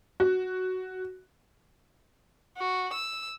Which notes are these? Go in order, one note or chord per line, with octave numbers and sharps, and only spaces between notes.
F#4
F#4
E6